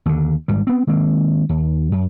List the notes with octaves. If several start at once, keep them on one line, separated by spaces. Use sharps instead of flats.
D#2 D3
G#1 G#2 G3
B3 C4
D#3 G#3 A#3 C4
D#2
F#2